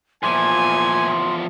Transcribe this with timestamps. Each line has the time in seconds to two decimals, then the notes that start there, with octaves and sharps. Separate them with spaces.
0.23 E2 A#2 F3 E5 G#5 C6